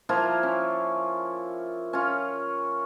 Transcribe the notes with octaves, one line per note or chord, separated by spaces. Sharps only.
F3 A#3 E4 F4
C#4
C#4 F4